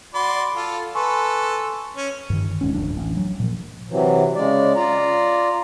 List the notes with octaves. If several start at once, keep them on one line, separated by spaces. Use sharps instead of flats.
F#4 D5 B5 C6
F4 A4
A4 B4 G#5 C6 C#6
C#4
G2 D#3
D#1 G#2 C#4
D1 F2 D4
A1
F#3
A#2 F3
C3 E3 F#3
C#3 G#3 D5
F4 D5 A#5